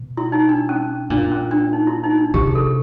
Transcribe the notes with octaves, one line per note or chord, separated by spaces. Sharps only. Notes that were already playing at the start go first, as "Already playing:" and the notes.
Already playing: B2
E4
D#4
D4
C#4
A#2 D4
C#4
D4
D#4
E4
D#4
D4
C3 G4
G#4
A4